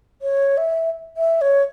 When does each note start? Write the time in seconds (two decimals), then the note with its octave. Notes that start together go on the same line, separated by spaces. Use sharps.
0.22 C#5
0.57 E5
1.17 E5
1.41 C#5